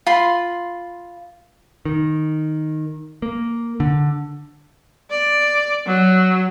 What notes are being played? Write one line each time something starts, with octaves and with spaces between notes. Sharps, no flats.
F4 B5 C6
D#3
A#3
D3
D5
F#3